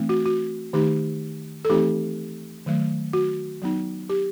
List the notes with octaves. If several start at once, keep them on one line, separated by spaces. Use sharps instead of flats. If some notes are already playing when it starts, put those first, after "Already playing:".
Already playing: E3 A3 C4 D#4
F#4
F#4
D#3 A3 D#4 G4
A4
E3 A3 C4 D#4 G4
D#3 F#3 A3
F#4
F#3 B3 D#4
G4